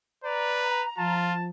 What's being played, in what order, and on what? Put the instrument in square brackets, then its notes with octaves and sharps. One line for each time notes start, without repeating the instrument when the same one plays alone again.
[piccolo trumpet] B4 [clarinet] D5 [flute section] A#5
[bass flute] F3 [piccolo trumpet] F4 [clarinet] A5